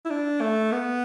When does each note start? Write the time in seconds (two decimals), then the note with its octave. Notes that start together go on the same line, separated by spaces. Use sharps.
0.05 E4
0.10 D4
0.41 A3
0.72 B3